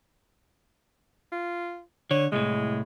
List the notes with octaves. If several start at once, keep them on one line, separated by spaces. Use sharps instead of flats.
F4
D3 C#5
C2 A2 G#3